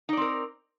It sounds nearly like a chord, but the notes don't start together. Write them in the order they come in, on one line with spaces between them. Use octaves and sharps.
D#4 D5 C4 A#4